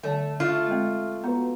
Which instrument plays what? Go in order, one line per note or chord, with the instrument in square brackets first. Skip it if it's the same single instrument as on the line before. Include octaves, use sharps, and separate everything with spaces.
[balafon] D3 F#3 [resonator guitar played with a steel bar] A3
[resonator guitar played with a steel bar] A3 F4 [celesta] E5 C#6 F6
[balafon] G#3 C4
[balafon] B3 F#4 [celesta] B4 A#5